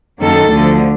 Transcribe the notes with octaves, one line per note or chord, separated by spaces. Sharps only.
F#2 D#3 F#3 A#3 A4
D2 D3 F3 A3